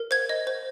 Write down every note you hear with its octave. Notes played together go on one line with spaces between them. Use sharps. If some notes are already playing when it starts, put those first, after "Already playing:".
Already playing: A#4
C5 G#6
D#5
C5